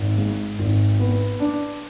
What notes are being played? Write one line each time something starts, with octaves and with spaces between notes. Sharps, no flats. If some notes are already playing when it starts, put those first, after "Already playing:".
Already playing: G#1
G#2
G#1
B3
D4